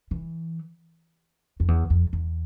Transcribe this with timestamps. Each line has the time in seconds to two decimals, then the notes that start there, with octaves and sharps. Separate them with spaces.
0.11 E3
1.60 F2
1.68 E2
1.90 F2
2.13 E2